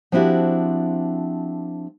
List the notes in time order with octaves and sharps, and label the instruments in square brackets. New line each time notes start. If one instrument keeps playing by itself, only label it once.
[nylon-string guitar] F3 C4 D4 E4 F#4 G4